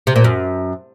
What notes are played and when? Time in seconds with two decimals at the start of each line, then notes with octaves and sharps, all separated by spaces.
0.07 C3
0.16 A#2
0.24 F#2